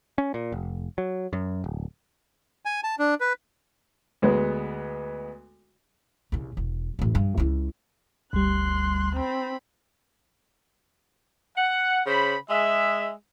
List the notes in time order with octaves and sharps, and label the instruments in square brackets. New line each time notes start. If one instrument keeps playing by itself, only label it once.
[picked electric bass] C#4
A#2
F1
F#3
F#2
D1
[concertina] G#5
A5
D4
B4
[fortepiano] D2 G#3 B3
[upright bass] C2 C#3
E1
A1 F#2
G2
C#2 E4
[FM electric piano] G1 G3 [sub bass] D2 [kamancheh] C6 F#6
[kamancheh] C4 B5
[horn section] F#5
C#3 C5 B5
G#3 E5